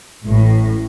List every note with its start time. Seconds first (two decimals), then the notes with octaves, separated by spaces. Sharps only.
0.25 A1 A2